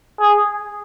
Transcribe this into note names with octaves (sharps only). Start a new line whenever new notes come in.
G#4